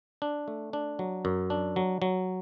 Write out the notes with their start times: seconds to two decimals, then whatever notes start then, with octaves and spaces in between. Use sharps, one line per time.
0.22 D4
0.48 A3
0.73 D4
0.99 F#3
1.25 F#2
1.50 D4
1.76 F#3
2.02 F#3